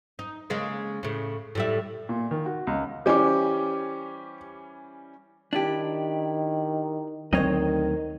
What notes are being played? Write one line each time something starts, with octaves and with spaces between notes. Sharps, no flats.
D#4
C#3 G#3 A#3
A2 C#3
A2 G3 E5
A#2
D#3
F#4
C#2
E3 G3 C#4 G4 C5 D6
D#3 D4 E4 G4
D2 D#3 F#3 C4 C5 C#5 D#5